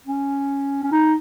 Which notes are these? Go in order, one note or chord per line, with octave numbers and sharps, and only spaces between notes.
C#4
C#4
D#4